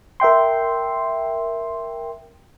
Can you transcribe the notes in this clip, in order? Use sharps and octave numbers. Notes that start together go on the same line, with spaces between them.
A#4 E5 G5 C6